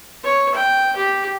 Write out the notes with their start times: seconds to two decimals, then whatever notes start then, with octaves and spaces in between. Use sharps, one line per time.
0.24 C#5
0.55 G5
0.96 G4